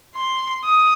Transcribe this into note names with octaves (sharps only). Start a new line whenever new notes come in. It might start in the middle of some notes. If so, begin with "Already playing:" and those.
C6
D#6